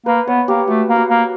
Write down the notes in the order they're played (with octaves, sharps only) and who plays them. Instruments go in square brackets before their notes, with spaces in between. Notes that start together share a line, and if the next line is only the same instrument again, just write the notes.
[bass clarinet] A#3 [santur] B4
[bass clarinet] B3 [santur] C#5
[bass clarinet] A#3 [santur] G4
[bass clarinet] A3 [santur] F#4
[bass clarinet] A#3
[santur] F#4
[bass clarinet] A#3